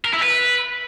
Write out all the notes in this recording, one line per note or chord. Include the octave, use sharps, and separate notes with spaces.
A#4
E4
B4